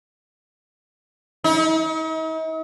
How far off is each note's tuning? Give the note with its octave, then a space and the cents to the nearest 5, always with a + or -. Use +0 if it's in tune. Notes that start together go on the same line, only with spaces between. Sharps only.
D#4 +45